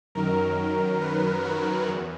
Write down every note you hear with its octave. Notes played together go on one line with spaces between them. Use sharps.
F#2 D#3 F#3 A#4
B4
F#4
E2